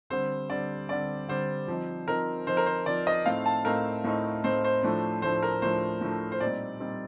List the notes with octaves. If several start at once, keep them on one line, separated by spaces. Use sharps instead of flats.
D3 G3 C4 C5
D3 G3 C4 D5
D3 G3 C4 D5
D3 G3 C4 C5
F3 C4 D#4
F3 C4 D#4 A#4
F3 C4 D#4 C5
A#4
C5
F3 C4 D#4 D5
D#5
A2 A3 C4 D#4 F5
A5
A2 A3 C4 D#4 A#4
A2 A3 C4 D#4
A2 A3 C4 D#4 C5
C5
A2 F3 A3 D4
A2 F3 A3 D4 C5
A#4
A2 F3 A3 D4 C5
A2 F3 A3 D4
C5
A#2 G3 C4 D#4 D5
A#2 G3 C4 D#4